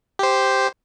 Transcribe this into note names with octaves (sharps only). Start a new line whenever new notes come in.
G4 C5